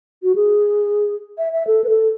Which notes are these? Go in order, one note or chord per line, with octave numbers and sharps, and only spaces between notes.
F#4
G#4
E5
E5
A4
B4
A4